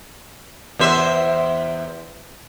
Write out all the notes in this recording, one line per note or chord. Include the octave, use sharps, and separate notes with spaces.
E2 C5 E5